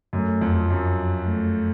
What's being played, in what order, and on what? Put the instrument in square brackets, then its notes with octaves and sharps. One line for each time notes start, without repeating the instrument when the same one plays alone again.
[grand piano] F#2 [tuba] A3
[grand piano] F2
[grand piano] F#2 [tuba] F#3
[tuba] A3